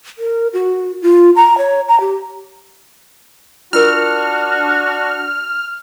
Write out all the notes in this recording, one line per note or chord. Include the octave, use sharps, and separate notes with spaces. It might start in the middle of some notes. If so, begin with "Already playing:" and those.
A#4
F#4
F4
A#5
C#5
A#5
G4
D4 F4 F#4 A#4 F6